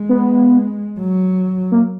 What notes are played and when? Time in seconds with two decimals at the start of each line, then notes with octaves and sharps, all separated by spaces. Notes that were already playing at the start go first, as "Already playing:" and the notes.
Already playing: G#3
0.09 B3
0.99 F#3
1.72 A#3